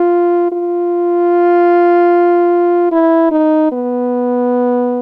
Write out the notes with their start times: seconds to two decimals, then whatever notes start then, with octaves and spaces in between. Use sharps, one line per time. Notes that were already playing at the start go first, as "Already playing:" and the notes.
Already playing: F4
0.52 F4
2.92 E4
3.31 D#4
3.72 B3